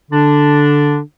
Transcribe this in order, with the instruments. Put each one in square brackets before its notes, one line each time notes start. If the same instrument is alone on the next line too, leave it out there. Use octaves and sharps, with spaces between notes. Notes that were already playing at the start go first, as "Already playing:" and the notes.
[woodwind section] D3 D4